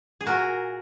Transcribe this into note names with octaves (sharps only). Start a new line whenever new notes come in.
G#4
A#2 F#4 A#4